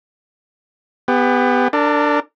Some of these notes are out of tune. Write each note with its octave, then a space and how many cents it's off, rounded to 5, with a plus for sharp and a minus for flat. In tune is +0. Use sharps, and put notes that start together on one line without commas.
B3 +15 G4 +35
D4 +0 A#4 -40